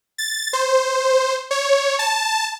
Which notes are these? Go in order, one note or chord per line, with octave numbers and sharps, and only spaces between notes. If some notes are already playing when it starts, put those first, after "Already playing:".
A6
C5
C#5
A5